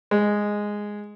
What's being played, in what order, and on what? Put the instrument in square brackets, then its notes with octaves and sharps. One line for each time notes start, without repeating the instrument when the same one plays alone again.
[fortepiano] G#3